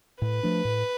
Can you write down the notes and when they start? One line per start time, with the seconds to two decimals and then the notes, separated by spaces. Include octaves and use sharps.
0.22 A2 B4
0.43 F3 A3 D4
0.65 A2